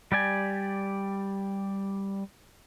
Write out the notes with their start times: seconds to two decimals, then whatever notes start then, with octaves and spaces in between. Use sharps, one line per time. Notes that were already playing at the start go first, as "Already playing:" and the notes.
0.12 G3 G4 D5 G#5